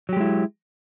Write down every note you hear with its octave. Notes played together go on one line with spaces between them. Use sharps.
F#3 G#3 E4 G4